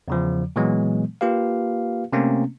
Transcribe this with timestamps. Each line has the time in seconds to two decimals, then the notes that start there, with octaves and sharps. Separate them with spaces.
0.08 E2 C#3 F3
0.56 A#2 E3 F#3 G#3 B3
1.21 A#3 F4 G4 B4 F5
2.13 C3 A3 A#3 C4 C#4